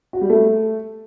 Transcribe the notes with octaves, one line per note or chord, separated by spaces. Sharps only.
F#4
G3
A3